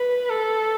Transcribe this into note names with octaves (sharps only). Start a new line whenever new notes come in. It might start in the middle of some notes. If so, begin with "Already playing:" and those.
Already playing: B4
A4